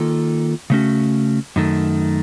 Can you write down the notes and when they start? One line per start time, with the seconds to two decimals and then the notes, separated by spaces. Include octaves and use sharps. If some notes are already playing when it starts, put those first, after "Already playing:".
Already playing: D#3 A#3 F4 A4
0.70 C#3 A3 C#4 F#4
1.56 F#2 D#3 A3